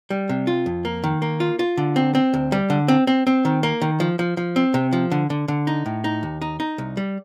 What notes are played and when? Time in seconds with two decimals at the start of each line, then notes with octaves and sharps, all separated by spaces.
0.10 G3
0.29 C3
0.47 F4
0.66 F2
0.85 A#3
1.04 D#3
1.22 A#3
1.40 F4
1.59 F4
1.78 D3
1.96 C4
2.15 C4
2.34 D2
2.52 G3
2.70 D3
2.88 C4
3.07 C4
3.27 C4
3.45 D#3
3.63 A#3
3.82 D#3
4.00 F3
4.19 F3
4.37 F3
4.56 C4
4.74 C3
4.93 F3
5.11 D3
5.30 D3
5.48 D3
5.67 D#4
5.86 A2
6.04 D#4
6.23 D#2
6.42 D#4
6.60 D#4
6.78 C2
6.97 G3